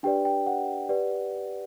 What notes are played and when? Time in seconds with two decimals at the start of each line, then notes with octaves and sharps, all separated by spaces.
0.03 D4 G4 B4 D5 G5
0.25 G5
0.47 F#5
0.89 G4 B4 D5